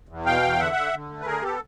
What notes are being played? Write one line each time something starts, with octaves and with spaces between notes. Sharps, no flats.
E2
B2 F5 G5
E2
D3 E5 F#5
D3
D3
A3
B4
D3 G#4 A#4
B3 G4 A4